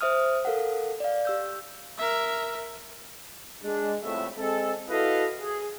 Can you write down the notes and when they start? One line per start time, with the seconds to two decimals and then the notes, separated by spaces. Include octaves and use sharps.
0.01 C5 E5 D#6 F6
0.45 A4 A#4 F5 F#5
1.00 D5 F5
1.25 G4 E6 G6
1.99 A#4 E5
3.62 G#3 D4
4.02 C2 F2 A2 A3 B3 E5
4.38 G#3 C4 G#4 A4
4.88 E4 F#4 A4 B4 D#5 F5
5.40 G#4